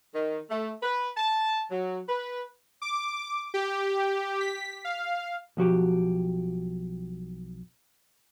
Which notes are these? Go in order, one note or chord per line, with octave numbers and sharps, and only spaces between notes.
D#3
A3
B4
A5
F#3
B4
D6
G4
B6
F5
B1 F3 F#4 G4